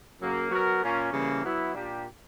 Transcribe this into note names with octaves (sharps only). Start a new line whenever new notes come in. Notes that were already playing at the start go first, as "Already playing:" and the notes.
F#2 C#3 F#3 A#3
F#3 B3 F#4 A#4
A#2 A#3 C#4
C#3 E3 G3 A#3
F#3 B3 E4
A#2 A#3 D4 G4